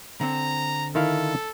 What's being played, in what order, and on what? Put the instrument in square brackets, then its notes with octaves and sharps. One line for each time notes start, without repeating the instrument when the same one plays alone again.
[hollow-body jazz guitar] D3 C4 [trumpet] A#5
[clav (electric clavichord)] D#3 E4 F5 [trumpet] A4